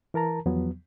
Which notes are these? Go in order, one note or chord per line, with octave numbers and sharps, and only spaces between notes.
E3 A#4 A5 A#5
E2 F3 F#3 B3